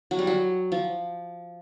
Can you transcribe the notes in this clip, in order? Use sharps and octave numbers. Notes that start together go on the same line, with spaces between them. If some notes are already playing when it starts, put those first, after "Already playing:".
F#3
G3
F#3
F3